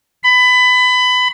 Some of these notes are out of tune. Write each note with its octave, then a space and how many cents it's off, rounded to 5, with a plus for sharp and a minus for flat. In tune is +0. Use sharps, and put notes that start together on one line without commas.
B5 +20